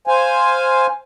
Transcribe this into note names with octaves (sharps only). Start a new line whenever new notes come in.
C5 F5 G#5